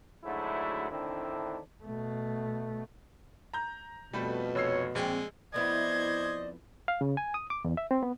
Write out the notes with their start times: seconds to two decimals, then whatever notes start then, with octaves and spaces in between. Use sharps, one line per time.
0.24 D2 G#2 D3 F#3 A3 E4
0.91 A2 D3 D#3 C4 D4 E4
1.84 B2 A3
3.54 A#5 G6
4.13 F2 B2 G3 A3 B4
4.55 F1 C#5 E6 C7
4.95 A#1 G#3 C4
5.54 F2 B3 E4 C5 D5 D#5 G#6
6.88 F5
7.01 C#3
7.17 G#5
7.34 D#6
7.50 D6
7.65 E2
7.77 E5
7.91 C4
8.03 B3